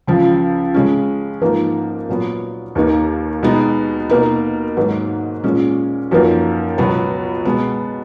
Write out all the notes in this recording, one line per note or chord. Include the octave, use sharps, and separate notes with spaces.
C#2 C#3 F3
C#3 G#3 C#4
G#2 F3 A#3 D#4
A#2 F#3 B3
D#2 D#3 A#3 D#4
B2 G#3 B3 D#4
B2 A#3 D#4
G#2 D#3 F#3 A#3 D#4
A#2 G#3 C#4
F#2 F3 A#3 D#4
C#2 B2 F#3 B3
B2 G#3 B3